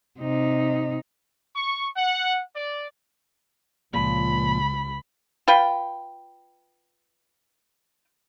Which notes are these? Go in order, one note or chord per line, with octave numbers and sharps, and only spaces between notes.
C3 D#4
C#6
F#5
D5
C#2 A#2 F3 B5
F4 B4 G5